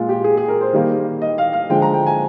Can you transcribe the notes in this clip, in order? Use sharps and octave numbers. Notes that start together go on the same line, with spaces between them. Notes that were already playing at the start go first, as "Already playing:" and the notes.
Already playing: A#2 G#3 F4
G4
G#4
G#4
A#4
C5
D#3 G3 A#3
D#5
F5
F5
D3 F3 G#3 G5
A#5
G5
G#5